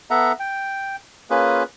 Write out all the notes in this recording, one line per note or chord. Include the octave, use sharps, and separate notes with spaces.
B3 A4 E5 F#5 A#5
G5
A#3 C#4 F4 G#4 B4